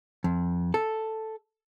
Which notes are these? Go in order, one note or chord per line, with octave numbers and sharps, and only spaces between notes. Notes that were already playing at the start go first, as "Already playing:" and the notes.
F2
A4